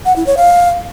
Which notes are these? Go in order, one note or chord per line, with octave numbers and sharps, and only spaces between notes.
F#5
E4
C#5
F5